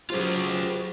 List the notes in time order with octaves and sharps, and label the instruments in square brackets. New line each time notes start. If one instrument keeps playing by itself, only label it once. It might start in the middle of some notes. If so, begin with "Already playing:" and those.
[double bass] F#3 [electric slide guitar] F4 G#4 [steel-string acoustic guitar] G4 C5 G5